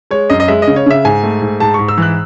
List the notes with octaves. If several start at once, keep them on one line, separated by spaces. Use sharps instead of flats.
G#3 C#5
F#2 D#5
D#5
G#3 E5
D#5
C#3
C#5
C#3 E5
G#2 G#5
A3
G#2
G#2 A5
G#2 C#6
E6
E3 F#6